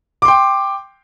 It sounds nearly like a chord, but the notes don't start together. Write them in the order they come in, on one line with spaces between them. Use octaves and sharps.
D6 C6 G5